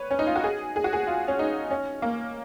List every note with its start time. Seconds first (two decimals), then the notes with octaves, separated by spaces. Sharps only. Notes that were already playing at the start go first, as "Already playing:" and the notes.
Already playing: B4 C#5
0.11 C#4
0.19 D#4
0.27 F4
0.36 F#4
0.44 G#4
0.76 G#4
0.84 F#4
0.93 G#4
1.07 F4
1.28 C#4
1.39 D#4
1.71 C#4
2.02 A#3